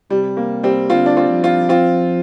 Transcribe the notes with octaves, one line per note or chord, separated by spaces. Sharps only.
C3 G3
A#3
G3 C4
D3 C4 F4
D4
C4 F4
F3
C4 F4
C4 F4